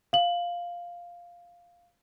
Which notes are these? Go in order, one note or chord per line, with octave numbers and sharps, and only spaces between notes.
F5 F#7